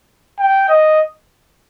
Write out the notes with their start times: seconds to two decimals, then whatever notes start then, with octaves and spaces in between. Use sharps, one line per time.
0.40 G5
0.69 D#5